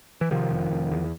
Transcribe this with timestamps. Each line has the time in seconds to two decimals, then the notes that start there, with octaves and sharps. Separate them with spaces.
0.21 E3
0.31 C3 D#3 F3
0.51 F1
0.71 F1
0.92 E2